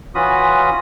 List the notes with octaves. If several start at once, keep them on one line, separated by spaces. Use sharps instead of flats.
E3 C#4 F4 F#4 B5 D#6